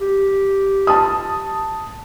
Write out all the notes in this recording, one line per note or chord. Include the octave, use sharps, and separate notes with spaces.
G4
A5 D#6